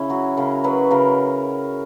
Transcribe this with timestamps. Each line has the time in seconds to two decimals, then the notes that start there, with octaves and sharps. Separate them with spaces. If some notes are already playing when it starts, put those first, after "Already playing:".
Already playing: C#3 C#4 E4
0.09 F#3 F#4
0.37 C#3 A#4
0.64 F#3 B4
0.91 C#3 A#4